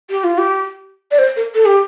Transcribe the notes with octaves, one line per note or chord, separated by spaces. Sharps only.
G4
F4
G4
D5
C5
A#4
A4
G4